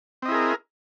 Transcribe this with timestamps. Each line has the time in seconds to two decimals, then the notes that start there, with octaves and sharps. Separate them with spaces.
0.22 C4
0.25 D#5
0.28 E4
0.31 G#4
0.34 A#4